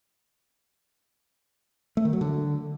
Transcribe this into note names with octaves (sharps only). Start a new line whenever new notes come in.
A3
D#3
F#3
D3